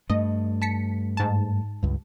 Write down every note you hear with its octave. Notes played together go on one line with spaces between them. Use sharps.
G2 A3 D#5
A5 B6 C#7
G#2 A5
C#2 G2